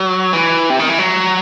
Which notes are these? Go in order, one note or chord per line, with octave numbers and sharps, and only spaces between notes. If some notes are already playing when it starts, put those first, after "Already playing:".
Already playing: F#3
E3
C3
D#3
E3
F#3